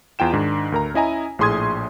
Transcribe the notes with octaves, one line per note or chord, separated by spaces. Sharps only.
E2 F4 G5 E7
G#2 D#3 D4
D2 A#4 A#5
C#4 E4 D#5 G#5 A#5
A#1 A2 G#4 C6 D#6 G#6